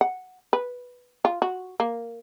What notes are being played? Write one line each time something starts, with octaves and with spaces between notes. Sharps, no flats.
F#5
B4
F4
F#4
A#3